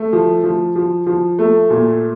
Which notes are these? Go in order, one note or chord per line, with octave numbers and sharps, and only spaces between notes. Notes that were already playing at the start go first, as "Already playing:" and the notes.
Already playing: A3
F3
F3
F3
F3
A3
A#2